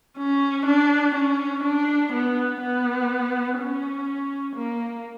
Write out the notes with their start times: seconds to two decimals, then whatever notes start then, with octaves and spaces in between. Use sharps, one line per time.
0.18 C#4
0.66 D4
1.15 C#4
1.63 D4
2.12 B3
2.61 B3
3.58 C#4
4.56 A#3